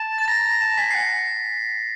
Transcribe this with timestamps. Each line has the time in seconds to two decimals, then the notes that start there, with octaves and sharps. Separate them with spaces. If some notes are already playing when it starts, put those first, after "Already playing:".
Already playing: A5
0.18 A6
0.28 A#5 A#6
0.45 A#5
0.52 A#6
0.62 A5
0.77 G#5 B6
0.91 C7
0.95 F#5